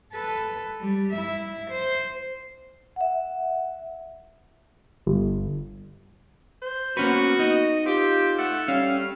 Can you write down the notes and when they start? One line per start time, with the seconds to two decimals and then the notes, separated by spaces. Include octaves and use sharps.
0.13 A4 B4
0.80 G3
1.12 E4 E5
1.70 C5
2.96 E5 F#5
5.07 G1
6.62 C5
6.97 A#3 B3 C#4 F#4 B4
7.39 D#4 D#5
7.86 C4 F4 G4
8.39 A3 F#5
8.68 G3 C#4 F5